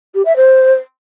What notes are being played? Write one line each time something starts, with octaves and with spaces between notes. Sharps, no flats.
G4
E5
C5